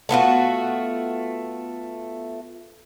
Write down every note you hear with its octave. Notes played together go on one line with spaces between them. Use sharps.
A3 B3 F4 F#4